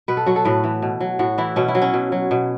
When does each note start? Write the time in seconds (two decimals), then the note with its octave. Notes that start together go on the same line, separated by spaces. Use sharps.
0.08 B2 B4
0.17 A4
0.26 F#3 F#4
0.36 A4
0.45 A2 B4
0.64 E3
0.82 B2
1.01 F#3
1.19 A2 F#4
1.38 E3 E4
1.56 B2 C#4
1.68 E4
1.75 F#3
1.82 C#4
1.94 B2
2.12 F#3
2.31 B2